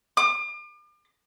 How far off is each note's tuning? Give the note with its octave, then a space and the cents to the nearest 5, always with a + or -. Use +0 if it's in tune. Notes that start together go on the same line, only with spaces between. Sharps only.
D6 +40